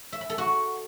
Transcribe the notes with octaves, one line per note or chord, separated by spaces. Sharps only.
E5
B5
A4
F#4